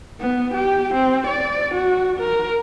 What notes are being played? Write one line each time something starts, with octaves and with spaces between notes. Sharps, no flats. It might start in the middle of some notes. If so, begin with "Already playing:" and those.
B3
G4
C4
D5
F#4
A#4